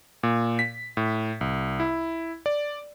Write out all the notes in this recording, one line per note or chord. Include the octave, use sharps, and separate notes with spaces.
A#2
B6
A2
C2
E4
D5